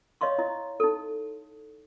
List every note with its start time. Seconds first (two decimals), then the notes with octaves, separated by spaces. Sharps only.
0.21 C#5 D#5 F5 C6 C#6
0.38 E4 D#5
0.80 D#4 A4